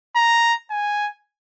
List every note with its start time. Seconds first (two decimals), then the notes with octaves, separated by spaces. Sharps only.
0.16 A#5
0.71 G#5